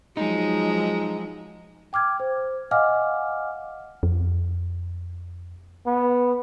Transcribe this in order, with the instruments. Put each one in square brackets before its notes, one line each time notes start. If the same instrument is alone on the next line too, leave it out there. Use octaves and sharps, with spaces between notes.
[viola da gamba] F3 F#3 G#3 [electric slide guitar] D#4
[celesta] G5 D6 F6 G#6
C5
D#5 F5 F#5 G#5 D6 F6
[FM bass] F2
[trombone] B3